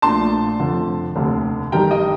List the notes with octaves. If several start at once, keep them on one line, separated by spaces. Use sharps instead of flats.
A#1 A#2 A3 D4 A5 C6
F1 F2 D3 F3
F1 D#2 D3
G1 G2 D#3 G3 G5 A#5
D#5 G5